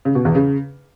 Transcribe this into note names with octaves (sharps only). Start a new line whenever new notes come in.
C#3
B2
E2
C#3